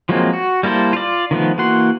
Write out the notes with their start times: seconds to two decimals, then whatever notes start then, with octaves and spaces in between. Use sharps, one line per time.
0.09 F3 F#3 G#3 A#3 C4
0.33 F#4
0.63 G3 A#3 E4 A4 C5
0.93 F4 D5
1.31 D#3 F3 A3 B3
1.58 E3 A#3 F#4 F#5 C6